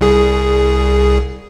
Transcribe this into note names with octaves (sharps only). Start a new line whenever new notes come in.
C2 G#4